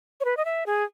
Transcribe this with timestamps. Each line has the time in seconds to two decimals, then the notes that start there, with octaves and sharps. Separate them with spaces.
0.21 C#5
0.25 B4
0.37 D#5
0.45 E5
0.66 G#4